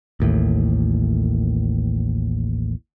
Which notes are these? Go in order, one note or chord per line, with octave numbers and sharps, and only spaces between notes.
A1 D#2 A2